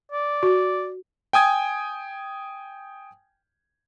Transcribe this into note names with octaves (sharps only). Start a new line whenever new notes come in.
D5
F#4
G5 G#5 D#6 G#6